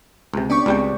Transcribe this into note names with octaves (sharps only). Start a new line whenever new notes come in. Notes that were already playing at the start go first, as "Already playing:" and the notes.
C#2 C3
B3 C#4 D4 D5 G5 C#6
C#2 G3 G#3 C4 G5